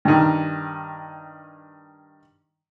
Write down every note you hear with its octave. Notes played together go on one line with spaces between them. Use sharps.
G2 D#3